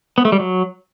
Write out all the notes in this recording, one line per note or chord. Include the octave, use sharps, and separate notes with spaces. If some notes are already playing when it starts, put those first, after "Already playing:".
B3
A3
G3
F#3